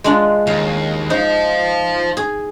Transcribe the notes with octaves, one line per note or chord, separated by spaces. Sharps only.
G#3 D4 F4
D#2 F5
D#4 C5 F5
G#4